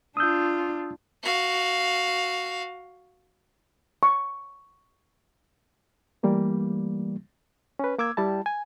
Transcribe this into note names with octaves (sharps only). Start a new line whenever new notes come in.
D4 F4 D#6 E6 G6
F#4 F5
C#6
E3 G3 A3 A#3 G4
C#4 B4
A#3 D6 E6 G#6
G3 E4 A5
G#5